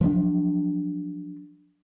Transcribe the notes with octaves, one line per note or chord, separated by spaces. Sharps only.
F3 F#3 A#3 D4